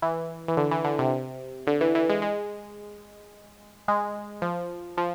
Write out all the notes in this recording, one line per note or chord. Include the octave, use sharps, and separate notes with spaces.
E3
E3
D3
E3
D3
C3
D3
E3
E3
G#3
G#3
G#3
F3
F3